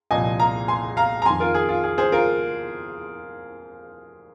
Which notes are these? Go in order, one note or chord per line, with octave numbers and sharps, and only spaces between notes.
C2 A#2 F3 D#5 G#5
F5 A#5
G#5 C6
F5 A#5
A#5
F2 D#3 G#5 C6
F4 A#4
G#4
F4
G#4
G#4 C5
F4 A#4